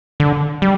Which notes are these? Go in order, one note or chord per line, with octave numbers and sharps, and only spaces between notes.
D3
G3